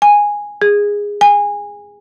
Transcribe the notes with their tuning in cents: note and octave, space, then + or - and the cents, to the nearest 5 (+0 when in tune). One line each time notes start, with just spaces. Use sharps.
G#5 -10
G#4 -15
G#5 -20